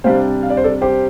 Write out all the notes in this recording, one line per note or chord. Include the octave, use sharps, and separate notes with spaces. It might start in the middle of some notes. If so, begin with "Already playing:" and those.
C3 G3 D4 C5 F5
F5
D5
C5
A4 D5
G4 C5